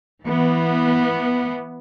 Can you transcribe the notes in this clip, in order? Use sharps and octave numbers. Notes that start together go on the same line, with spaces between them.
E3 B3